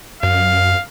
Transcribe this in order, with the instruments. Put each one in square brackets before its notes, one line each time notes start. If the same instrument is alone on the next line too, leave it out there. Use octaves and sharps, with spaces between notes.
[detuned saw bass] F#2 [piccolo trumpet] F5